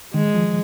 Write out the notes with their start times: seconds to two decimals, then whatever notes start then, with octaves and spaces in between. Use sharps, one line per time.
0.14 D#3 G#3
0.35 F3